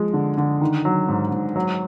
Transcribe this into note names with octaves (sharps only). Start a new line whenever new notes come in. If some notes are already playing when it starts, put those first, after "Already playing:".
Already playing: F3 G#3
D3
D3
D#3
F#3
G#2
G#2
F#3